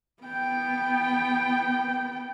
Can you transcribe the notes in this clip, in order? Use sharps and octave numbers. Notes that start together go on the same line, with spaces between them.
B3 G5